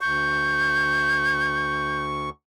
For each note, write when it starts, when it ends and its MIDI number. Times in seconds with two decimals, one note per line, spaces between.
0.01 2.29 38
0.01 2.29 85
0.01 2.02 91